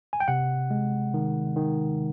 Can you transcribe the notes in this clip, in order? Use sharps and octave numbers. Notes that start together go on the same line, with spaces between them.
G#5
G5
C3 F#5
G#3
D#3
D#3